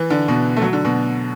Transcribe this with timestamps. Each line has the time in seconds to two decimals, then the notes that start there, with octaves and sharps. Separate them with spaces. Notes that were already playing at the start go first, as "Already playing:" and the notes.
Already playing: E3
0.10 D3
0.28 B2
0.56 A3
0.62 F#3
0.73 D3
0.85 B2